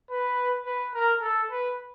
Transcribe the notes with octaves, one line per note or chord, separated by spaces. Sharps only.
B4
B4
A#4
A4
B4